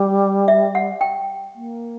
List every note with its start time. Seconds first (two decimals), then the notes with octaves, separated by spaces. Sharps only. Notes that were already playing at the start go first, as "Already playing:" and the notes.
Already playing: G3
0.48 E5
0.75 F#5
1.01 G5
1.55 A#3